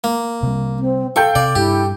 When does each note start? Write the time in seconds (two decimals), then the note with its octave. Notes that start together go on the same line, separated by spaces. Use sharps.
0.04 A#3
0.43 C3 G3
0.79 C4
1.16 A4 F5 G5 C#6 G6
1.35 C3 D5
1.55 G2 E4 G4